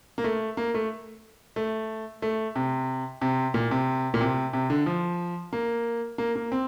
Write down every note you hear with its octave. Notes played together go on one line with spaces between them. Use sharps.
A#3
A3
A#3
A3
A3
A3
C3
C3
A#2
C3
A#2
C3
C3
D3
F3
A#3
A#3
A#3
C4